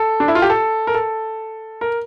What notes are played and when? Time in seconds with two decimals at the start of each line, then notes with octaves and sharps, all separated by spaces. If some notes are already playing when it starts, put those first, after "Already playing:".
Already playing: A4
0.20 D4
0.28 E4
0.35 F4
0.42 G4
0.50 A4
0.87 A#4
0.94 A4
1.81 A#4